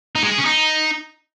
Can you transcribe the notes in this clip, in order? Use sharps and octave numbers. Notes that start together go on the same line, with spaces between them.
D#4
G#3
G#4
C#4
D#4